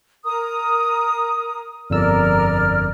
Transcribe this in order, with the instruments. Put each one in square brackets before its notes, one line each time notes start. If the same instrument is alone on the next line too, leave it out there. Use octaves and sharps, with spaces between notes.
[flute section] A#4 A#5 D#6
[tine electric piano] G1 F2 E6 [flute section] A#4 D5 F6